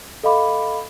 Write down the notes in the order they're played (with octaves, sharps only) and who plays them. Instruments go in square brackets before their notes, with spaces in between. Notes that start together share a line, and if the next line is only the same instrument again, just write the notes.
[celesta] A4 D#5 F5 B5 D6